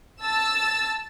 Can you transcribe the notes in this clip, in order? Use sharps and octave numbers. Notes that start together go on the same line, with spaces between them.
A5 E6 A6